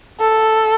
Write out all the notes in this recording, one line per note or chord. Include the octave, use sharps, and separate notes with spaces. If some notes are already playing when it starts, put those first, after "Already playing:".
A4